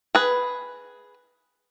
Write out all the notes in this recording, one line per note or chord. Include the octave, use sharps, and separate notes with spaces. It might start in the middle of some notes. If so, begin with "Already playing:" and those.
G#4 B4